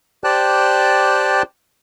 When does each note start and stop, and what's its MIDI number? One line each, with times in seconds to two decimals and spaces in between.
0.24 1.43 67
0.24 1.43 72
0.24 1.43 74
0.24 1.43 79
0.24 1.43 81
0.24 1.43 90